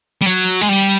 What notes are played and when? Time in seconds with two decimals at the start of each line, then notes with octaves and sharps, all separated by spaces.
0.22 G3
0.26 F#3
0.62 G#3
0.69 G3